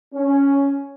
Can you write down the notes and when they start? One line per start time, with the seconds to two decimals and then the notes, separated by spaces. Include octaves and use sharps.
0.14 C#4